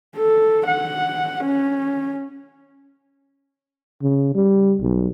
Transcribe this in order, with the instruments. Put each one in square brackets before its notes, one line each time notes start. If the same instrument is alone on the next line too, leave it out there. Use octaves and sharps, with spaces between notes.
[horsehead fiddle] A4
F#5
C#4
[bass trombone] C#3
G3
B1